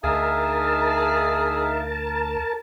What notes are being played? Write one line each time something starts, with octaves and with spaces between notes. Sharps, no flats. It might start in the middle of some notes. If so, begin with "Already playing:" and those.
D2 D#4 G#4 A#4 E5 F5 A5